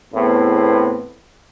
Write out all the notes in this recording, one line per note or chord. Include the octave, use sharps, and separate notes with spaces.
E2 A2 B3 C4